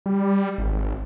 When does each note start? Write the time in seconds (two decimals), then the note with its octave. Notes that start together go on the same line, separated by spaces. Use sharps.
0.06 G3
0.58 G#1